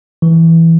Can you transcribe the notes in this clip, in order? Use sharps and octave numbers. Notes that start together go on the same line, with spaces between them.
E3